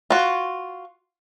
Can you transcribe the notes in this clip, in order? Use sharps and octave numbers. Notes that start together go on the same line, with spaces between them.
F4 F#4